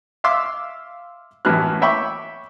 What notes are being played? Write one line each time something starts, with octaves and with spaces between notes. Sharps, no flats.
E5 F5 C6 D6 E6
F#2 A2 E3 F#3 F6 F#6
C#5 E5 G5 B5 C#6 D6